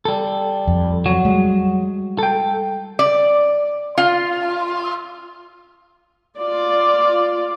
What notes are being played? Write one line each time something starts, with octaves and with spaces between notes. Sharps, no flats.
G3 A4
F2
F#3 F#4
G3 G#3
A4 G5
D5
F4
F4 D5